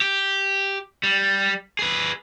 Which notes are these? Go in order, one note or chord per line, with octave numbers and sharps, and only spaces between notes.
G4
G3
G#4 B4